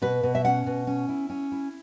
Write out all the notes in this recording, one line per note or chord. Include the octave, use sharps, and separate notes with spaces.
B2 B4
B2
E5
C#4 F#5
B2
C#4
E4
C#4
E4